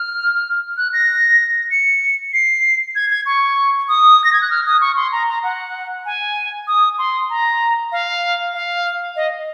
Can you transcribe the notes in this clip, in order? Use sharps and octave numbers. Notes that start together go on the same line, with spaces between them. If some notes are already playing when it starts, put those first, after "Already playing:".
Already playing: F6
F#6
A#6
C#7
C7
G#6
G#6
C#6
D#6
A#6
G#6
F#6
F6
D#6
C#6
C6
A#5
A#5
F#5
G#5
D#6
C6
A#5
F5
F5
D#5